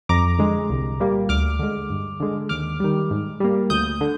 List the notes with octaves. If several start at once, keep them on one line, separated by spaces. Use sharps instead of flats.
F2 A#5 D6
D3 G#3
C2
A#2 G3 A#3
D2 D6 F6
D3 G#3
G2
D3 G#3
D#2 D6 F6
D#3 G3
G#2
G3 A#3
D2 D#6 G6
D3